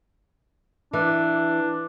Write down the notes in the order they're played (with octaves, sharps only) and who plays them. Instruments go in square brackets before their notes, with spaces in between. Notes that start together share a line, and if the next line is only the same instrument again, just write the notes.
[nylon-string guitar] E3 [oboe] D4